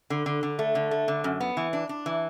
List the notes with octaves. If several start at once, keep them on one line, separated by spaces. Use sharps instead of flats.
D3
D3
D3
A3
D3
A3
D3
F#2
B3
E3
D4
D4
E3